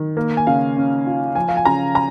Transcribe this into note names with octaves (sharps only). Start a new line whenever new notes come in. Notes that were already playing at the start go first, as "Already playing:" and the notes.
Already playing: D#3
A#3
G#5
C#3 F5
C#4
F4
F3 G#5
F5
G#5
C#3 A#5
A#5